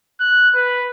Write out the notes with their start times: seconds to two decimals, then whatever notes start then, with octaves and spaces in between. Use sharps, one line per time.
0.20 F#6
0.55 B4